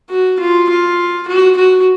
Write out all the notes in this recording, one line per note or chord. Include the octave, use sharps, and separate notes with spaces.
F#4
F4
F4
F#4
F#4